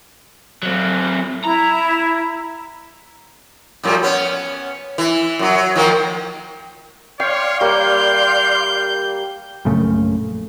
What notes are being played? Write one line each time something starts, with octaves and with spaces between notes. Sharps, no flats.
F#3 C4
E4 A#5
F2 A#2 G3
B3 C#4
E3
F#2 F#3
F#3
D#3 F3 A#3
C#5 D5 F5 G5 C6
G3 A#3 G6
A#1 F#2 C#3 A3